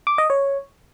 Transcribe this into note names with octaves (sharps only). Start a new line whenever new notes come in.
D6
D#5
C#5